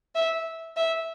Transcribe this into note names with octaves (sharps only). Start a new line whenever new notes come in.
E5
E5